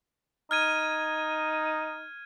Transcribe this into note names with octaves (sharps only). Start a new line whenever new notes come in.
D#4 F6 G#6 D#7